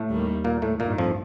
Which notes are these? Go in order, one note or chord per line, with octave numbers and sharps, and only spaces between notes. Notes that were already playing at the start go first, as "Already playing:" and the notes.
Already playing: A2 A3
D#2 D#3 G3 A#3
A#2 A#3
A2 A3
A1 G2 A#2 D#3 A#3
F2 F3